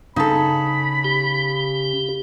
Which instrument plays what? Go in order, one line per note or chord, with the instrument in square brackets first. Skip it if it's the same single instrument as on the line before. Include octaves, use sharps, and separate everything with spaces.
[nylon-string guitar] C#3 [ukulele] D#4 A4 [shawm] B5
[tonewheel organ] G4